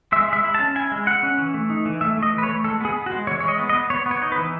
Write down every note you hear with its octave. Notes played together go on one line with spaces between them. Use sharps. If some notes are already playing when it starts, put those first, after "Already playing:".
G#3 E5
G#3 E5
E4
A5
C#4
E4 G#5
G#3
E4 F#5
C#4
E3
A3
D#4
E3
A3 E5
A3
D#5
E3
B4
C#5
A3
G#3 A4
B3 G#4
B3
F#4
G#3
E3 C#5
G#3 C#5
D#5
B3
D#5
B3
B3 C#5
B3
C#5
D#4
B4
E3